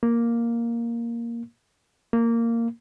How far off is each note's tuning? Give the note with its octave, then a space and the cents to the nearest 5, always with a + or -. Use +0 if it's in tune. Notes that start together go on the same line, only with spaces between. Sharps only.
A#3 +0
A#3 -15